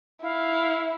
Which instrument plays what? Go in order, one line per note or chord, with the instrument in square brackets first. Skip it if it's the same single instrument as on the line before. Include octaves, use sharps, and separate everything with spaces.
[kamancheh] E4 [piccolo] F5